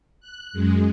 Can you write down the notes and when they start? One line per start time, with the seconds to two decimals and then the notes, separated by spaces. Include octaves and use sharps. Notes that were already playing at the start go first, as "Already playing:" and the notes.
0.20 F#6
0.53 F#2 G#3